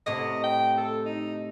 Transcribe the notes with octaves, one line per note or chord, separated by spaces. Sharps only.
A2 C3 D#5
G5
A4
D#4